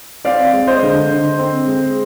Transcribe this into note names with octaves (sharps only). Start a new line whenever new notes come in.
C4 D5 F5
G#3
C5 D#5
D3
D3
C4
G#3